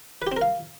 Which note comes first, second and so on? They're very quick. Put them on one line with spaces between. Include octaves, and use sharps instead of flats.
B4 G4 C4 A#4 F5